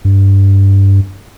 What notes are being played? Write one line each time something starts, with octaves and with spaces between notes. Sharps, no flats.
G2